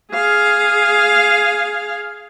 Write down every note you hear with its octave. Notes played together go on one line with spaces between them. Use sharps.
G#4 F5